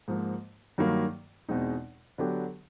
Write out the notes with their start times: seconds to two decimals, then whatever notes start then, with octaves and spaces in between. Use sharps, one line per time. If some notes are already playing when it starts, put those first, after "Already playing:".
0.08 G#2 F3 A#3
0.78 G2 D#3 F#3 A#3
1.48 E2 B2 G#3 C4 D#4
2.18 D3 F#3 B3 D4 G4